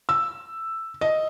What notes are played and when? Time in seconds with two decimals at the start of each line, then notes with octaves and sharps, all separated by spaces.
0.09 E6
1.01 D#5